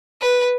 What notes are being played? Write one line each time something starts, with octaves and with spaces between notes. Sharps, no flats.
B4